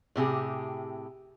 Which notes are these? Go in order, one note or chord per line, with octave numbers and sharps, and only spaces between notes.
A2 C3 G4 G#4